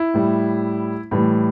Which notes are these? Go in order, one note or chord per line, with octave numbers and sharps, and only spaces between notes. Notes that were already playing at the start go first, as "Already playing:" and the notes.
Already playing: E4
A2 G3
A2 E3 G3